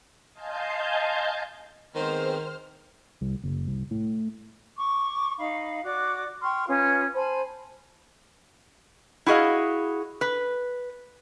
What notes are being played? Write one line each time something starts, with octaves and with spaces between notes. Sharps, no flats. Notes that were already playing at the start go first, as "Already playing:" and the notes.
D#5 F5 G#5 A5 C6 G6
D#3 G#3 B3 C4 C5 F6
C2
F#1
C2
A2
C#6 D6
D#4 F5 B5
F#4 D5 D6
G5 C6 C#6 F6
C#4 F4 B4 D#6
C5 G#5 A5 B5
E4 F#4 G#4 D#5 F5
B4